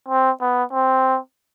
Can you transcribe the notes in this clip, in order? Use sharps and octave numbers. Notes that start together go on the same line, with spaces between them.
C4
B3
C4